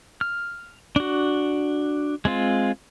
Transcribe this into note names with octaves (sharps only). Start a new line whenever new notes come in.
F6
D4 F#4
G#3 C4 F4